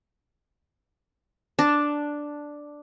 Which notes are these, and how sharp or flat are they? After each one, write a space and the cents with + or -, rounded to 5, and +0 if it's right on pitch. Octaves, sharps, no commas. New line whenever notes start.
D4 +0 A5 +0